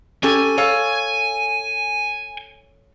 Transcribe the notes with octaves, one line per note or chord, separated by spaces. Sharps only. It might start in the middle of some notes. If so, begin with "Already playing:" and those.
C#4 G4 A4 G#5
A4 C#5 F5